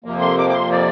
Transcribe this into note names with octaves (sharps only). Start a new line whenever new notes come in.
F2 C3 F3 A#3
C6
D6
D6
C6
D5